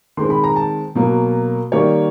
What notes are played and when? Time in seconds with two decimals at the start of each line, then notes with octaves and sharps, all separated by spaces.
0.17 D#3 G#3 C4 C6
0.30 B5
0.44 A#5
0.56 A5
0.95 B2 F#3 A#3
1.72 D#3 G3 A#3 C#5